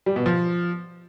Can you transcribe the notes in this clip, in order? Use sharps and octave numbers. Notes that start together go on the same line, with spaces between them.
G3
B2
F3